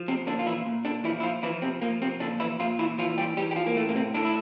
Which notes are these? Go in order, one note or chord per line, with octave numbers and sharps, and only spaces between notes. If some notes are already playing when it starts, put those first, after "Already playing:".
Already playing: F3
C3 C4
A#2 D3 D4
F4
E3 E4
A#2
D3 D4
E3 F3 E4
E4
F3 F4
E3 F3 E4
C3 C4
A#2 F3 A#3
C3 C4
A#2 D3 D4
E3 E4
A#2 F3 F4
E3 E4
E3 F3 F4
G3 G4
E3 G3 G4
G4
F3 F4
A#3
A2 A3
A#3
C3 C4
A2 D3 D4
E4